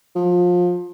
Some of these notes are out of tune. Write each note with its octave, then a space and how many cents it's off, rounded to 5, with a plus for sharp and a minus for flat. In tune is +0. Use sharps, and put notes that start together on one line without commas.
F3 +25